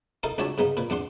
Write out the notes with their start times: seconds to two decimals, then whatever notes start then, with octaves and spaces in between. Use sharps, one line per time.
0.23 D#4 E4 A4 A#4 F5
0.38 C#2 D4 F#4 C#5 E5 A5
0.58 G#2 C#3 B3 D#4
0.77 A#2 B4
0.90 E2 D4 F#5 C6